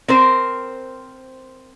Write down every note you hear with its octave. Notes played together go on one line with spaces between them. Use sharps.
C4 A#4 C5